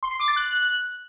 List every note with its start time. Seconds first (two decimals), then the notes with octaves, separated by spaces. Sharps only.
0.03 C6
0.11 C7
0.19 D6
0.28 A6
0.36 F#6